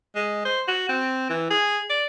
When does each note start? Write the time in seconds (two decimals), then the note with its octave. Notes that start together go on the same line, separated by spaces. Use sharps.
0.15 G#3
0.45 C5
0.68 F#4
0.89 C4
1.29 E3
1.50 G#4
1.90 D5